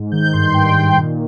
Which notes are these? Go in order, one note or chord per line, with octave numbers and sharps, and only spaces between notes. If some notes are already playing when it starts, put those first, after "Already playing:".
Already playing: G#2
D#3 G6
G2 C6
D#3 G5
D#3
A#2